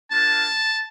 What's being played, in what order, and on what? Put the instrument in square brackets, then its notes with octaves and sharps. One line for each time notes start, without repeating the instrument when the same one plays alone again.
[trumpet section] A#3 D4 F4 A5